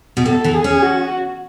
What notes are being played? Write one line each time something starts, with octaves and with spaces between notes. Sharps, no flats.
B2
A2 A4
E3
G#4
C#4
F#4